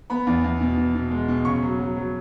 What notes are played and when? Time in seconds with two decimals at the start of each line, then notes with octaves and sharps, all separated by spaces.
0.10 B3 B5
0.27 E2
0.44 E2
0.61 B2
0.77 B2
0.95 B2
1.11 G#3
1.28 B2
1.45 C#3 C#6
1.62 F#3
1.79 F#3
1.97 F#3